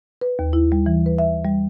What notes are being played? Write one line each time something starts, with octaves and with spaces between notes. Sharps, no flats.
B4
D#2
E4
G3
E3
B4
E5
G3